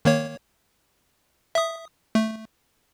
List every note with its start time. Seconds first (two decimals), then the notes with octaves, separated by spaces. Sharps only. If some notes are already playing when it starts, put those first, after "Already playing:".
0.05 D#3 A#3 C#5
1.55 E5 D#6
2.15 A3